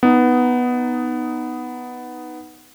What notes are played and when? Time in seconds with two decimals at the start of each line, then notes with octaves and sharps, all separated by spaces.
0.03 B3 D#4